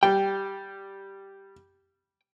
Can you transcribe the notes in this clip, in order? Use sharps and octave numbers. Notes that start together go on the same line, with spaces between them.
G3 G5